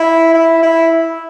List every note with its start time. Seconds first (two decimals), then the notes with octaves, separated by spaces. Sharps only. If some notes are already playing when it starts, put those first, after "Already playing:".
Already playing: E4
0.34 E4
0.62 E4